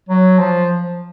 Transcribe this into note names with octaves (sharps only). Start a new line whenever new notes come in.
F#3
F3